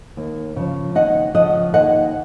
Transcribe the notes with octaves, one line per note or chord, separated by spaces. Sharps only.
D#2
C#3 F3
D#2 D#5 F#5
C#3 F3 D#5 F#5
D#2 D#5 F#5